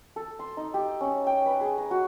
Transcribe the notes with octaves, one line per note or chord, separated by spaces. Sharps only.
A4
C6
D#4
G4
C#4
G5
B4
G#4
A#5
F#4